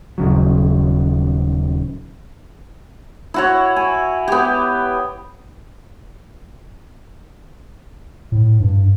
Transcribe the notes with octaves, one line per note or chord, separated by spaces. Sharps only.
D#1 C#3 F#3
E4 F#4 C#5
G#5
B3 G4
A2
G2